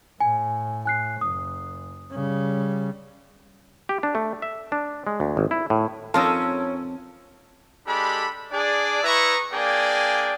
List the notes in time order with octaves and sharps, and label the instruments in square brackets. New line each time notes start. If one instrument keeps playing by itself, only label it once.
[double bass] A2 [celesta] G#5
[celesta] G#5 F#6 C7
[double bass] F#1 [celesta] D#6
[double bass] C#3 G3
[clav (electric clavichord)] G4
D4
A3
E5
D4
G#3
D2
G#1
E4
A2
[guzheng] F2 D#4 D#5 [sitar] C#4 A#4 [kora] F4 [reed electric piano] A5 E6
[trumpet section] G#3 D4 G4 A4 B5
D4 G#4 D5
E4 B4 D#5 E5 A#5 C#6
A#3 D4 G#4 D5 G5 G#5